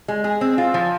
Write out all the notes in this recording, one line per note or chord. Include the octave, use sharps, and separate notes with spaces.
G#3
G#4
C4
F4
F3